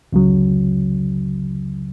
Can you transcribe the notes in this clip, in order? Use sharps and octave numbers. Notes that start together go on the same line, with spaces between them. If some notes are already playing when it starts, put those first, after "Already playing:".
C#2 C#3 F#3